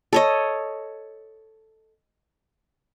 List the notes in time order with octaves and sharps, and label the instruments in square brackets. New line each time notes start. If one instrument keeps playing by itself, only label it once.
[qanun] A4 C#5 D#5